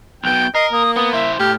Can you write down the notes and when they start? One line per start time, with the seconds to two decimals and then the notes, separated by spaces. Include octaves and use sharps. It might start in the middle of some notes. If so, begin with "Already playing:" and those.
0.24 B1 B2 G5
0.55 A#4 D#5 C7
0.73 A#3 D#6
0.96 B3 D#6
1.13 E4 C5 E5
1.39 A2 G4 F6